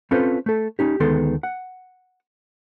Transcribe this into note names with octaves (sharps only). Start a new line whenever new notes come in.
C4 C#4 F4 A4 B4 C5
A3 A4
C#4 D#4 G4
D2 D#3 G#3 B3 A4 C6
F#5